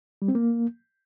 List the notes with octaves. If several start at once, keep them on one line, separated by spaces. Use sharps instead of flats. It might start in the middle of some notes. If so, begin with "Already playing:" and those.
G3
C4
A#3